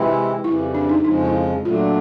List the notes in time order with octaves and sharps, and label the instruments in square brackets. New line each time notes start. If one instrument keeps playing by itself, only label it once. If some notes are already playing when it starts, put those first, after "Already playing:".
Already playing: [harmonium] C3 E3 G#3 C4 E4 [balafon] F4
[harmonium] F2 C#3 E3 G3 [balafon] E4
[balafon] D4
D#4
[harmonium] F2 C#3 F3 G#3 [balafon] D#4
[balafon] E4
[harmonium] A#2 F#3 A3 D4 [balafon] F4